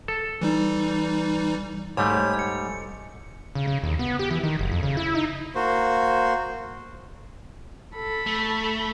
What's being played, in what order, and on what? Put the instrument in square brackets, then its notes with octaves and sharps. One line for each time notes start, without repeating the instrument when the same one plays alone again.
[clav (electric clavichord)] A4
[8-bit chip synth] E3 G3 D#4
[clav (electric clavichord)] G#2 G3 A3 [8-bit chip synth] C#5
[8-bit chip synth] C#7
[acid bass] C#3
C#3
D#2
B3
G4
E3
D#3
F#1
F2
C#3
E4
D#4
[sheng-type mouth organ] A#3 F#4 C5
[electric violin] A4 B5
[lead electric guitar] A3